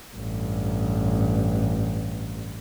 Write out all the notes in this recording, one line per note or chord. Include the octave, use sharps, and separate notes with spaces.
A1 G2